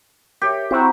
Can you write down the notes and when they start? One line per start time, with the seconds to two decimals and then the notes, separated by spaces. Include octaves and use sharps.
0.42 G4 A#4 C#5 E5
0.71 C4 E4 F#4 C5 A#5